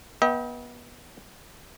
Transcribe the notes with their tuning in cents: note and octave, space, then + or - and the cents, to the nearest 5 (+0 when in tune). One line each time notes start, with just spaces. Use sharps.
B3 -30 D#5 +45 G5 +0